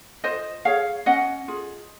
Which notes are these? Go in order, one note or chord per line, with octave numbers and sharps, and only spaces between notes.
F4 C5 D#5
G#4 C#5 F5
C#4 D#5 F#5
F4 G#4